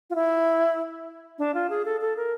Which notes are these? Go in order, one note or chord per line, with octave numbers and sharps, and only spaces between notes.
F4
E4
D4
F4
G#4
A4
A4
A#4